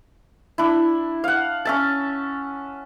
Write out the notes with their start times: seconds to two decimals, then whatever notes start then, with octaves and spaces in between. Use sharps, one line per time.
0.58 D4 E4
1.24 F5 F#5
1.65 C#4 E5 A5